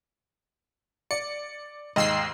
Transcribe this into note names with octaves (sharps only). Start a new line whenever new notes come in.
D5 C#7
D#2 G#2 D#5 E6 C7